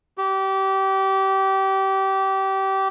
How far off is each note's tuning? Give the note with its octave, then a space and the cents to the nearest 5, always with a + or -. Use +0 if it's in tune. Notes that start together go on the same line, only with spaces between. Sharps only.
G4 -25